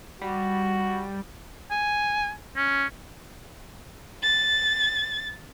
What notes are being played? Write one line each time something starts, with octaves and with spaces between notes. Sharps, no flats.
G3 F#4
G#5
C#4
A6